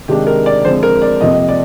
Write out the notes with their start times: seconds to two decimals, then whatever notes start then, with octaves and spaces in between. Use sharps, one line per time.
0.08 C3 D#3 G#3 D4 G4
0.27 A#4
0.46 D5
0.65 D3 F3 G#3 C4 C5
0.83 A#4
1.02 D5
1.21 F2 C3 F3 A#3 D#5
1.49 D5